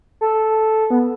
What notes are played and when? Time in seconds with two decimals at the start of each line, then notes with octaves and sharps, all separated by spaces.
0.21 A4
0.90 B3